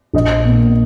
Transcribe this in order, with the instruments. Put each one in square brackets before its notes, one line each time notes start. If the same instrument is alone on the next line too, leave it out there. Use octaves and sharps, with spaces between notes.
[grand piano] A#1 D#5
A#2 A#3